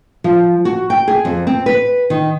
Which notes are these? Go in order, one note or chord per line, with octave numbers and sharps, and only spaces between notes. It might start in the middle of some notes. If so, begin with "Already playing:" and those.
F3
F#4
G5
G#4
F2
C4
B4
D#3